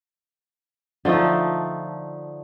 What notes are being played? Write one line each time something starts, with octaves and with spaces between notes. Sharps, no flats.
D3 F3 A3 D#4